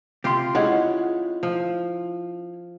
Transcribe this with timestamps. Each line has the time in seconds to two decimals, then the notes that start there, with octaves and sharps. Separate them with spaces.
0.24 C3 F4 G4 C6
0.55 G#3 C#4 E4 F4 F#5
1.43 F3